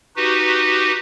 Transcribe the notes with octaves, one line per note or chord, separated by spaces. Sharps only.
D#4 F#4 G4 B4